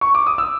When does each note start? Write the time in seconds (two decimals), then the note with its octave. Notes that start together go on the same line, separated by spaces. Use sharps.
0.01 C#6
0.15 D6
0.27 D#6
0.38 E6